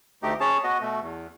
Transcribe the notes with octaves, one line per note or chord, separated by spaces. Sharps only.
D2 A3 D#4 G4
C#4 G#4 C#5 A5
B3 F#4 D#5
B2 A3
E2